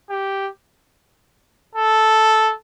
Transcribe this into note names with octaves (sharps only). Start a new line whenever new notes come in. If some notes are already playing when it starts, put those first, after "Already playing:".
G4
A4